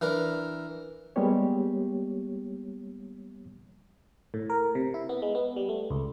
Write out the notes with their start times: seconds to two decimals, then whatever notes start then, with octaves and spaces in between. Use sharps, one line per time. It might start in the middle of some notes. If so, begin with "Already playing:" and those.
0.01 E3 D4 A#4
1.16 G3 G#3 A#3 B3 G4 C#5
4.34 A2
4.50 A#4
4.75 C3
4.94 E4
5.09 B3
5.22 G#3
5.35 B3
5.56 G3
5.69 A3
5.90 C#2